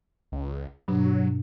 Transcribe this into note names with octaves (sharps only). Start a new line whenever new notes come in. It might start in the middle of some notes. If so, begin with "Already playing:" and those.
C#2
G2 B2 F#3 D4